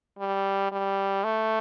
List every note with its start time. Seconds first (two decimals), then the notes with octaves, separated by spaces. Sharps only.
0.19 G3
0.72 G3
1.24 A3